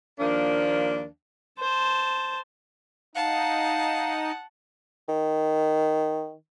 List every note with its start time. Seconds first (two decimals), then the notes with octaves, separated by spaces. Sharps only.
0.19 D#2 F3 A#3 D4
1.59 C5 A5
3.15 D#4 F5 F#5 A5
5.09 D#3